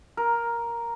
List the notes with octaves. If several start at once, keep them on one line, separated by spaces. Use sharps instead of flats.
A#4